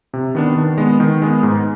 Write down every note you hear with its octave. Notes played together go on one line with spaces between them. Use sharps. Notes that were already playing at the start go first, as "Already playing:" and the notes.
C3
D#3 B3 D4
D#3
G#3 B3
D#3
G#3 B3
G#2